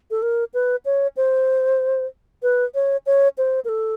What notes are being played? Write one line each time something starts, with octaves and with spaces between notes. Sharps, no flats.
A4
A#4
B4
C#5
C5
B4
C#5
C#5
C5
A#4
A4